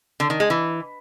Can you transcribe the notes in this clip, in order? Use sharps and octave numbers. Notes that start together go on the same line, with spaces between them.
D3
D#3
G#3
E3